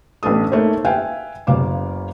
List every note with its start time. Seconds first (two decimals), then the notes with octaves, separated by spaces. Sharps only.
0.23 A1 B3 D4 A4 D#6
0.52 A3 A#3 D#4 C5 C#5
0.85 B4 E5 F5 G5 G#5
1.47 F#1 C#3 B3 F5 D6